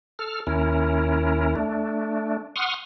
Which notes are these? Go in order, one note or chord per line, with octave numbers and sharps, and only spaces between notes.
A4 F6
D#2 C#4 E4 A#4
A3 D4
F#5 C6 C#6 D#6 F6